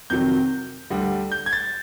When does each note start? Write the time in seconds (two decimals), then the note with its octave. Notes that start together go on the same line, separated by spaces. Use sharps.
0.10 F2 C3 D#3 F#3 G6
0.90 D2 D3 G3
1.32 G6
1.46 G#6
1.53 A6